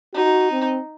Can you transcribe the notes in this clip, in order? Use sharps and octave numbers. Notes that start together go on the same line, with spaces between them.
D#4 F#4
C4